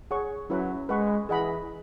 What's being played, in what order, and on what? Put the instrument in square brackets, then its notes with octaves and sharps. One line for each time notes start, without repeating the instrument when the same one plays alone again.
[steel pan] G#4 C#5 F#5 C#6
[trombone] F#3 [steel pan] C#4 E4 B4 F#5
[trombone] G#3 [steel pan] B4 F#5 C#6
[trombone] E3 [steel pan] G#4 D#5 F#5 B5